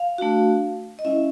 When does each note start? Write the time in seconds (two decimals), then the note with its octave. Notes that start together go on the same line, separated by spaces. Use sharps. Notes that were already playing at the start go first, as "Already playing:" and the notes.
Already playing: F5
0.18 A3 D4 F#4
0.99 D#5
1.05 G#3 C#4 E4 E5